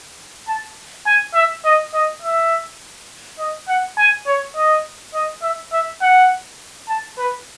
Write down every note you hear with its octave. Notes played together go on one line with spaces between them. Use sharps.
A5
G#5
E5
D#5
D#5
E5
D#5
F#5
G#5
C#5
D#5
D#5
E5
E5
F#5
A5
B4